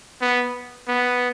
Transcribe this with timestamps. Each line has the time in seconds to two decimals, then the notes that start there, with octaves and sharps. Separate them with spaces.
0.22 B3
0.88 B3